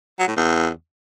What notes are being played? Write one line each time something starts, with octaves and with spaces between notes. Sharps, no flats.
F#3
A2
E2